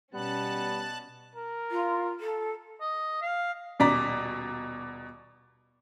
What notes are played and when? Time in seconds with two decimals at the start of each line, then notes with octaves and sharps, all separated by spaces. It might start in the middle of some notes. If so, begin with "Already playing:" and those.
0.14 B2 G3 B3 C#4 A5 F#6
1.35 A#4
1.71 F4
2.19 A4
2.81 D#5
3.22 F5
3.80 D#1 B2 D5 A#5 B6